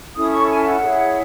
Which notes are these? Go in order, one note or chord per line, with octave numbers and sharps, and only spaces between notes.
C#4 E4 A4 D#6
C#6
G#5
F#5
E4 G#4 C#5